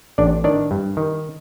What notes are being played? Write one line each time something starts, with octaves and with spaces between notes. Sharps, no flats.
A1 D4 D5
D#3 D4 D5
G2
D#3